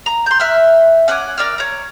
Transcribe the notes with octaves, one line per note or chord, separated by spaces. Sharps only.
A#5
C6 G6
E5 F6 F#6
C#4 F#5 G#5 D6
A#4 D5 E6 F6
C#5 A#5